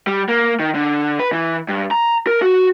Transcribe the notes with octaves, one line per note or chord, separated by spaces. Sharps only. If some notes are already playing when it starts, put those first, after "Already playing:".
G3
A#3
D#3
D3
B4
E3
G2
A#5
A#4
F#4